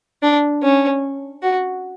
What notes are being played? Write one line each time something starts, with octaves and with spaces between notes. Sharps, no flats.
D4
C#4
F#4